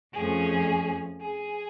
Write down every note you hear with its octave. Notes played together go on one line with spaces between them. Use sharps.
F2 F3 A3 C#4 G#4
G#4